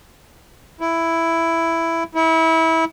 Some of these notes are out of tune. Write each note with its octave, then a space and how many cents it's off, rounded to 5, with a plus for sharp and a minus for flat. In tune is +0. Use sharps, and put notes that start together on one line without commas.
E4 +5
E4 -25